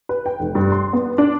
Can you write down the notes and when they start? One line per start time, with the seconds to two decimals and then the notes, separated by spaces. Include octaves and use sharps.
0.09 B4
0.26 G5
0.40 F1
0.55 G2
0.72 C6
0.93 B3
1.18 D4